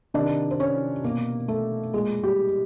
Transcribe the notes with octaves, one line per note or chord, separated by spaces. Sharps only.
C3 D#3 D4 D5
C5
C#4 C#5
B2 A#3 A#4
A3 A4
A#2 G#3 G#4
G3 G4